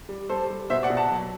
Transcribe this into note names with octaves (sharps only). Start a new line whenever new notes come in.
G3
G3 A4 C5
G3
B2 C5 E5
D5 F#5
B2
F#5 A5
F#3